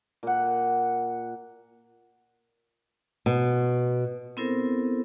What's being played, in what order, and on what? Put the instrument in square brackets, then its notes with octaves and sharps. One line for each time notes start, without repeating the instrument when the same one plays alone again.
[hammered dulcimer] A#2 F#5
[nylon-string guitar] B2
[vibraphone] B3 C4 E4 A4 A#4 C5